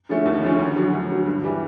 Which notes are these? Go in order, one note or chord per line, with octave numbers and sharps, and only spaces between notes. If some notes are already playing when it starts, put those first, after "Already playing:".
D3 F3 A3 C#4
D#2
D3 F3 A3 C#4
D2
D3 F#3
D2
D3 F#3
G2
E3 G3